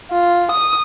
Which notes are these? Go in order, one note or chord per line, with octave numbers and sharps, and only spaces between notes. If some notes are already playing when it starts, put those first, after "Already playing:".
F4
D#6